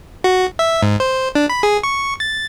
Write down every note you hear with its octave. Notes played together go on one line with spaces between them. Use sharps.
F#4
E5
G#2
C5
D4
B5
G#4
C#6
A6